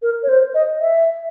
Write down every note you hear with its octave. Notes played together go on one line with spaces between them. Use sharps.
A#4
C#5
C5
D#5
E5